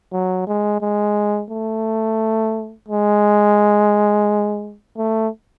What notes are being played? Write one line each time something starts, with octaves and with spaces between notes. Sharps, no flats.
F#3
G#3
G#3
A3
G#3
A3